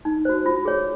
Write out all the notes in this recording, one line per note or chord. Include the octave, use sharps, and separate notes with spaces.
D#4
F#4 C5
F4
G#4 C#5